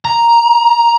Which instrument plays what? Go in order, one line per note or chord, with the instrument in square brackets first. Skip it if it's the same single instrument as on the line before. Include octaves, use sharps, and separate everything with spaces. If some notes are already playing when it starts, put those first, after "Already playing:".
[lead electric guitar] A#5